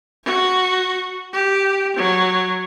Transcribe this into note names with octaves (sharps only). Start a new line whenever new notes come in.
F#4
G4
F#3